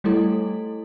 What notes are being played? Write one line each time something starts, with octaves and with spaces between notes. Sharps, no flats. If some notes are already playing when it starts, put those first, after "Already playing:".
G3 A3 E4 A4